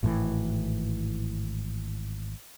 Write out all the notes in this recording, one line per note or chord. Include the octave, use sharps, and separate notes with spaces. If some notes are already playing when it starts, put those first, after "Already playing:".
G#1 A2 D#3 E3